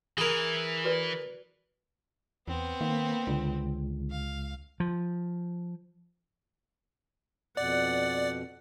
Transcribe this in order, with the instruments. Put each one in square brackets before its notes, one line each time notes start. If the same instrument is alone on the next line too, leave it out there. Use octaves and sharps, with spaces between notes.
[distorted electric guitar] E3 [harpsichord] G#4 A#4 [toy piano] B5
[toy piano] F#4 B4 D5
[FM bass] E2 [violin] B3 C4
[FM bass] D#3 [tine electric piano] A#3
[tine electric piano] C#2 [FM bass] D3
[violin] F5
[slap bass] F3
[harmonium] F2 B2 [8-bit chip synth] D5 [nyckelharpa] F#5